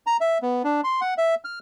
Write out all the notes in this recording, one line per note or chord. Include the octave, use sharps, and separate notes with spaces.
A#5
E5
B3
D4
C6
F#5
E5
F6